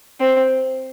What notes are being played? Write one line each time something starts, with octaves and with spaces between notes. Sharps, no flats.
C4